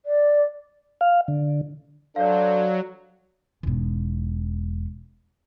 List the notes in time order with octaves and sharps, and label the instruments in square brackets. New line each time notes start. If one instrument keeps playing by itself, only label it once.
[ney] D5
[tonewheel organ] F5
D3
[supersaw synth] F#3 [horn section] D4 A4 C5 [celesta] D5 F5
[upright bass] E1 G#2